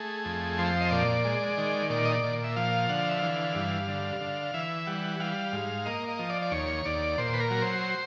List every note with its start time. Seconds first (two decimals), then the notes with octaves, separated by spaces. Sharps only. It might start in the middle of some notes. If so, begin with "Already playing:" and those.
Already playing: A3 G#4
0.25 F2
0.58 F3 C5
0.81 D#5
0.91 A#2 D5
1.25 G#3
1.58 D#3
1.90 A#2 D5
2.05 D#5
2.12 D5
2.24 A#2
2.44 E5
2.56 F3 F5
2.89 D3 F#5
2.99 F5
3.09 E5
3.19 E3 F5
3.55 G2
3.88 D3
4.21 D3
4.54 E3 E5
4.86 G3 F#5
5.20 G3 F5
5.53 G#2
5.85 A#3 D#5
6.08 D#5
6.19 F3
6.30 D5
6.42 D5
6.51 D#2 C#5
6.85 D#2 D5
7.18 A#2 C5
7.34 B4
7.40 A#4
7.50 F#3
7.62 C5